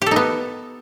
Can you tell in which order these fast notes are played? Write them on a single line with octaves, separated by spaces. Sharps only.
G4 A4 D#4 B3